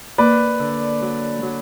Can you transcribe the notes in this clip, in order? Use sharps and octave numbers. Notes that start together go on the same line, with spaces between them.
A#3 B4 D5
D3
F#3
F#3